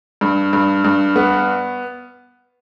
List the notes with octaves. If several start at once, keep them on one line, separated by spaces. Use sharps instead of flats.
G2
G2
G2
B3